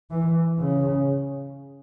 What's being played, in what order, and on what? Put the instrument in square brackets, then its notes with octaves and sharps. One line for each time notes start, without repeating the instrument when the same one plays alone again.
[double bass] E3
C#3